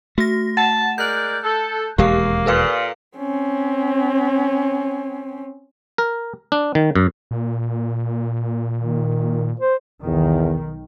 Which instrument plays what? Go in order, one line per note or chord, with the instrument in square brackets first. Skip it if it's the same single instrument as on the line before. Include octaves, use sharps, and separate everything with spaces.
[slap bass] A3 [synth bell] F#4 A#6
[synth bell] F#5 [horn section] A5
[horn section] G#3 A#4 D5 [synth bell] F#6 G6
[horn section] A4
[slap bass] E1 D#2 G#3 [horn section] A#3 [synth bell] G4 A#4 F5
[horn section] A#2 [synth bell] A4 B4 F5
[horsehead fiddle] C4 C#4
[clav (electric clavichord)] A#4
D4
D#3
F#2
[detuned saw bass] A#2
[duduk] D#3
C5
[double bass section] B1 D#3 [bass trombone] E2